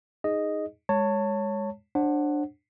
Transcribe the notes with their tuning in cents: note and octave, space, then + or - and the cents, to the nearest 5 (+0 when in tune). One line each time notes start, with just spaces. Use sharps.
D#4 +5 G#4 +0 D#5 +0
G#3 -15 C#5 +0 A5 +25
D4 +10 C5 +40 F#5 +0